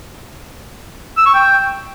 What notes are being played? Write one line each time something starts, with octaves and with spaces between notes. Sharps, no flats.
E6
C#6
G5